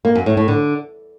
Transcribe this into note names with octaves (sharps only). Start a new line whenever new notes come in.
A#3
F#2
A2
A2
D3